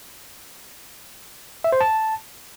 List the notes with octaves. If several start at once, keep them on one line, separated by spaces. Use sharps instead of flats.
E5
C5
A5